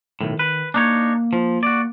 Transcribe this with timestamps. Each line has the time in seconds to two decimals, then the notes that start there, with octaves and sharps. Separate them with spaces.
0.21 B1 A2 D#3
0.39 B4
0.74 A#3 D4 D#4 C#5
1.33 F3
1.63 F#4 D5